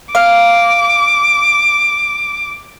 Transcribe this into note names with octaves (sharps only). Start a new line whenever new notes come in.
F5 D6